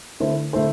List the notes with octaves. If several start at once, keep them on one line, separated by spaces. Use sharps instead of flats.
D3 A3 E4 A4 C5
D3 A3 E4 A4 C5